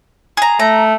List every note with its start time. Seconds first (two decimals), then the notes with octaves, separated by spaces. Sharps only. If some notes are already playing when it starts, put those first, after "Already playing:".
0.37 G#4 A#5
0.60 A3 A#5